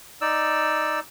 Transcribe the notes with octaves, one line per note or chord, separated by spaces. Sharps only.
D#4 D5 E6